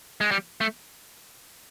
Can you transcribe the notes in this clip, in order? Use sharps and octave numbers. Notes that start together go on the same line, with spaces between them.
G#3
G3
A3